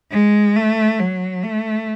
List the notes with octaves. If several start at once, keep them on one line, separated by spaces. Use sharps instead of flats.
G#3
A3
F#3
A3